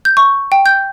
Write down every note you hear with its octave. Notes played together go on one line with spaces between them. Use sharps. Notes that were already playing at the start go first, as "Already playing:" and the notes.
G6
C#6
G5
G6